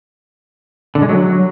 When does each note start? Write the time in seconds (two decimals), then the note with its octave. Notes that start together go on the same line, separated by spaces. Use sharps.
0.95 D3
1.02 G#3
1.09 F#3